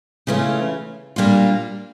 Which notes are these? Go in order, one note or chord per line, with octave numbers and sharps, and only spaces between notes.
C#3 E3 A3 C#4 F4
A#2 G3 A#3 D4 F4